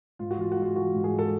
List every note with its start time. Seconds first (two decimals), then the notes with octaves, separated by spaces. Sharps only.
0.19 G#2 F4
0.31 F#4
0.38 E3 F4
0.52 F#4
0.57 G#3
0.62 F4
0.76 E3 F#4
0.94 G#2
1.04 G#4
1.14 G#3 A4